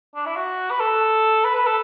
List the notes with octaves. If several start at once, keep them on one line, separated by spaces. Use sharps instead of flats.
D4
E4
F#4
B4
A4
B4
B4
A4